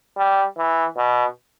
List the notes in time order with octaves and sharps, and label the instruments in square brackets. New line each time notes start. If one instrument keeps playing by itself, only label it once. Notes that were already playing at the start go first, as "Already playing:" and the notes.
[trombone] G3
E3
B2